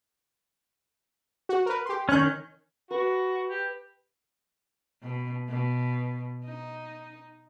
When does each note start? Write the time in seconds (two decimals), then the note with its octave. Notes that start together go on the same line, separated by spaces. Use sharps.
1.49 F#4
1.66 A#4 B4
1.86 G4 C6
2.09 D#3 C#4 C#6 F#6 G6
2.91 F#4 B4
3.49 G4
5.03 B2
5.49 B2
6.45 D#4